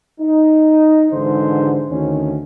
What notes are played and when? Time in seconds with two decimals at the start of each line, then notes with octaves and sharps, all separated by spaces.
0.20 D#4
1.11 G#1 G#2 D3 E3 D#4 C5
1.90 D2 D#3 C#4